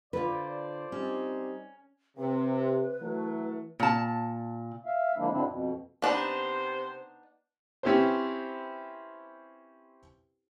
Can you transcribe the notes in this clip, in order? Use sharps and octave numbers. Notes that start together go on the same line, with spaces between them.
D3 F4 B4 C5 D5
G3 C4 C#4 D#4
C3 B4
E3 F#3 A3
A#2 A5
E5 F5
D3 F3 G#3 A#3 D4 E4
G#2 B2 D3 C4 D4 E4
F2 B2
C3 B3 D4 D#4 C5
C4 C#4 E4 G4 B4 C5